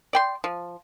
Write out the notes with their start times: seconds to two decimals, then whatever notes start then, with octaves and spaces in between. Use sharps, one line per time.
0.13 D5 G5 C6
0.44 F3